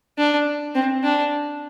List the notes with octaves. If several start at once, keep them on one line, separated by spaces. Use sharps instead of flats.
D4
C4
D4